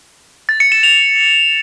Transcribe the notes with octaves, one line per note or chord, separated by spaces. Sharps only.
A6
C#7
E7
F7